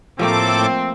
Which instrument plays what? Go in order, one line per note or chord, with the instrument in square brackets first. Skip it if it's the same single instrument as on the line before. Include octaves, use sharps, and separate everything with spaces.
[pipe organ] A2 A4 D6 [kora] F3 A3 A#3 [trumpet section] C4